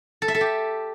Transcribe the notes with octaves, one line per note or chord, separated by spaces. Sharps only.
A4
E5
A4
G4